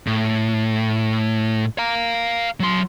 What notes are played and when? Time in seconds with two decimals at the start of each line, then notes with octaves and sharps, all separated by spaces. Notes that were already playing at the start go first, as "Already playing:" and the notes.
0.07 A2
1.78 F5 A#5
2.60 F#3 C6